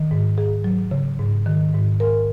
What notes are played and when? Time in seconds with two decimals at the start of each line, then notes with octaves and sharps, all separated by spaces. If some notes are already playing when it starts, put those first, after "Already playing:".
Already playing: D#3
0.11 G#2
0.38 G#4
0.64 F#3
0.91 C#3
1.19 G#2
1.46 D#3
1.74 G#2
2.00 A#4